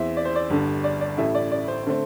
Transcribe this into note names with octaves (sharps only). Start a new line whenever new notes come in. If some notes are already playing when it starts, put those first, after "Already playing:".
Already playing: E2 E3 C4 E4 E5
D5
C5
D5
G1 G2 D3
D5
D5
A1 A2 A3 E4 E5
D5
D5
C5
D3 A3 C4